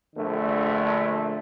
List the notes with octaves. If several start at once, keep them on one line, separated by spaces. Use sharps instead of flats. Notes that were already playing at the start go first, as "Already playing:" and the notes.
A#1 D3 A3